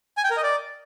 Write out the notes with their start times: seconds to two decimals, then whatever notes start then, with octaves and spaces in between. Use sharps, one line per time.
0.17 G#5
0.24 G5
0.30 A#4
0.37 D#5
0.43 D5